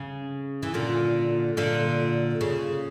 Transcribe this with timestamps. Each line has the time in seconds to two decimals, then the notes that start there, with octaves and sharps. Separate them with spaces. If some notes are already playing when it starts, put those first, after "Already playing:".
Already playing: C#3
0.63 E3
0.74 A#2 D3
1.57 A#2 D3
2.41 C#3